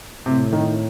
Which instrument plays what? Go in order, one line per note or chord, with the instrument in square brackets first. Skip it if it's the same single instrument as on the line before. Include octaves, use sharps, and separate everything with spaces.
[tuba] A2 [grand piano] C3
[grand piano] D#3